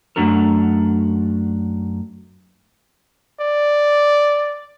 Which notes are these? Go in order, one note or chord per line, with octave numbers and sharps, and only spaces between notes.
F#2 A3 D4 F#4 A#4
D5